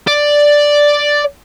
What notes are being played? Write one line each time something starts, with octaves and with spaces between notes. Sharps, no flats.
D5